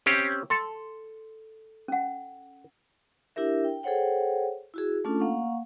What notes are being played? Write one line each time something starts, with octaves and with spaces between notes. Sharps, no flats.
C4 C#4 G4
A4 C6
C#4 F#5
D4 E4 G4 A#4 E5
G5
G#4 A4 C5 C#5 F#5 G5
E4 F#4 G#4
A3 C#4 D4 F4 A4
A#3 F5 F#5 C#6